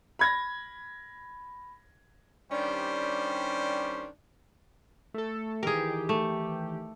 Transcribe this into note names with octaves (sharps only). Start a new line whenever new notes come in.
B5 G#6 A#6
D#3 G3 C#4 D4 G4 C5
A3 A4
D#3 E3 G4 G#4 A#4
A3